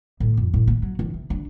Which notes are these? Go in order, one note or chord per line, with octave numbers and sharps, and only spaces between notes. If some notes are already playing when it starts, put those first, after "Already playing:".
A2
F2
A2
A#3
F#3
E2
C3
D4